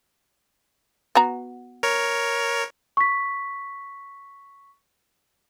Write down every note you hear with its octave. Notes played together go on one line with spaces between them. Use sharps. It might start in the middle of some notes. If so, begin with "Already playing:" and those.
B3 F#4 A#5
A#4 C#5
C#6 B6